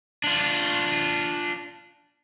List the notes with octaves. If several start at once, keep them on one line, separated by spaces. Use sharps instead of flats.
D4 F4